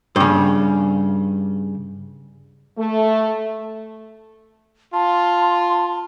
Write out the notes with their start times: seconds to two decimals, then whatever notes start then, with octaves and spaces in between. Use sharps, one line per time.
0.16 G2 C#3
2.79 A3
4.94 F4 A5 C6